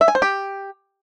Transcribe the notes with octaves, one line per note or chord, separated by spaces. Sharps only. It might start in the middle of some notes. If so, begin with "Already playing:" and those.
E5
G#5
C5
G4